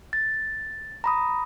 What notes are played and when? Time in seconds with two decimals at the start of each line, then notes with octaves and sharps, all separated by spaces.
0.13 A6
1.04 A#5 B5 D#6